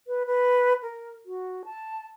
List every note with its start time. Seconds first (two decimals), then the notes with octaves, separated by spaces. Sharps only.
0.07 B4
0.26 B4
0.83 A#4
1.26 F#4
1.65 A5